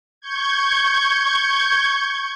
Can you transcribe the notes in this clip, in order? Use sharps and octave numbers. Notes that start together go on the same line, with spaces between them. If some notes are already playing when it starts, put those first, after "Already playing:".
C#6 G6 G#6